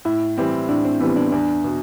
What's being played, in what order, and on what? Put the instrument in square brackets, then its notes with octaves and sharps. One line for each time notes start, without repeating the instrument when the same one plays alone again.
[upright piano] A2 [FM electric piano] E4
[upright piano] E3 G3 C4
[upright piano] A2 [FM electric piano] D4
[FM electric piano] C4
[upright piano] E3 G3 C4 [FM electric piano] B3
[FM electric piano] D4
[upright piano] E2 [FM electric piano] D4
[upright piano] B2